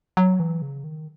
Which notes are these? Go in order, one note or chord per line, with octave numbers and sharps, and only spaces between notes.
F#3
E3
C#3
D#3